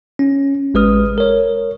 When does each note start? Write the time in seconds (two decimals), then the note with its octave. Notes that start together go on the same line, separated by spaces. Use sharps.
0.19 C#4
0.74 A1 G#3 B4 D#6 F6
1.18 A#4 C#5